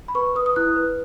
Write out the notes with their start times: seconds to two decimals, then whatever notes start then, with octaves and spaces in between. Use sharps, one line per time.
0.08 B5
0.15 B4 C#6
0.35 B4 D#6
0.46 D#6
0.56 E4 F#6
0.76 B4